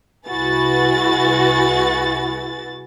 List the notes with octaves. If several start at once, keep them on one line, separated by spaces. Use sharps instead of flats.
C2 E4 F#4 G#4 B4 A6